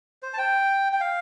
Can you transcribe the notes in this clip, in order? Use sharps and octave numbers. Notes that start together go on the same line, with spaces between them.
C5
A5
G5
G5
F5